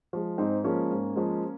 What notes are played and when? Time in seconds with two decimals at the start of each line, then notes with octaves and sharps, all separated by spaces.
0.13 F3 G#3
0.38 G#2 C4 D#4
0.64 F3 G#3 A#3 C#4
0.91 G#2
1.16 F3 G#3